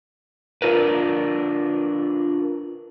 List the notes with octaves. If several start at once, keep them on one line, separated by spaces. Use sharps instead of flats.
D4 F4 A#4 B4